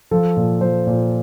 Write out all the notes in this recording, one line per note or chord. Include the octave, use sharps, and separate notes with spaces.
F3 A4
A#2
F3 C5
A#2